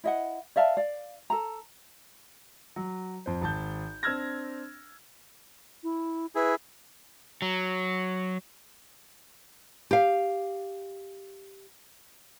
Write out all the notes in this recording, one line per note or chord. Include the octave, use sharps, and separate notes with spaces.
E4 D#5 F#5
D5 E5 F5 A5
D5 F5
A4 A#5
F#3
F2 C5
G#1 A5 G6
C4 D4 E6 F6 G#6 A#6
E4
E4 G#4 B4
F#3
G4 F5